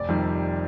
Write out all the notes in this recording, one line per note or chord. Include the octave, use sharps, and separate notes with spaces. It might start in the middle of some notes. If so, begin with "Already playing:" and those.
Already playing: F1 D5
F2 C3 D#3 G3